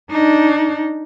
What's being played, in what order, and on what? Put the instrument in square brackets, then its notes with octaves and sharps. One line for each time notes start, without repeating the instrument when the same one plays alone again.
[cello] D4 D#4